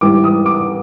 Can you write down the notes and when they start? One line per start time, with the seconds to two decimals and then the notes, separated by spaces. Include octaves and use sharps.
0.01 G#2 E3 G3 D6
0.24 D#6
0.46 D6